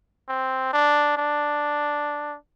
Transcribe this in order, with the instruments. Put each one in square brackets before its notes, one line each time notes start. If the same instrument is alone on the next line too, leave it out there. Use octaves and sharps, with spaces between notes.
[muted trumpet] C4
D4
D4